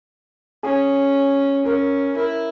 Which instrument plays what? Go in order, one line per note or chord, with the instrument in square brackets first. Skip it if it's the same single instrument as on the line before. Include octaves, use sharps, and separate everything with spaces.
[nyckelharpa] C#4 [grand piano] G#4
[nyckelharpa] C#4 [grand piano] A#4
[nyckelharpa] E4 [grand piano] A#4